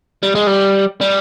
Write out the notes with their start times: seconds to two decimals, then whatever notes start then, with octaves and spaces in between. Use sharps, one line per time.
0.23 G3
0.35 G#3
0.47 G3
1.01 G3